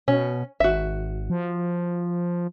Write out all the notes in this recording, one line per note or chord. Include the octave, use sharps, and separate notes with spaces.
B2 C#4
G#1 F#4 E5
F3